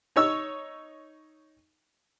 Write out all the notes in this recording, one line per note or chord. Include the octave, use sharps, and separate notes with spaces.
D#4 C#5 E6